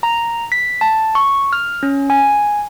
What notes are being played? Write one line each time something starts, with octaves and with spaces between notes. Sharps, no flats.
A#5
B6
A5
C#6
F6
C#4
G#5